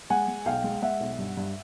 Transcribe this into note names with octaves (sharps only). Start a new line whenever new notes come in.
G#3 F#5 G#5
G#3
B1 F5 G5
G#3
G#3 E5 F#5
B1
G2
G2